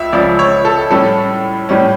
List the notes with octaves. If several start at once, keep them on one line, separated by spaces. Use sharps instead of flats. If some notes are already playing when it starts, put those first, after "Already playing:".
Already playing: C#2 F3 E5
C#2 C#3 F3 D5
C#5
A4
A2 G3 C#4 A4
A2 G3 C#4